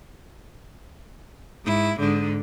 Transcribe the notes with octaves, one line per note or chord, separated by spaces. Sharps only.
G#2 E4
G#2 D3